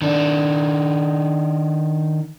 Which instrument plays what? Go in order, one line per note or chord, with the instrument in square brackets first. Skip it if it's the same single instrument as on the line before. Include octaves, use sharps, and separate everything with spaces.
[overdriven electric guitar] D#3 D4